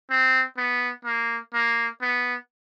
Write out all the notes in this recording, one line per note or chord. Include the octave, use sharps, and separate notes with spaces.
C4
B3
A#3
A#3
B3